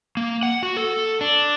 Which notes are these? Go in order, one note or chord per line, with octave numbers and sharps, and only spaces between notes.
A#3
F#5
F#4
A4
D4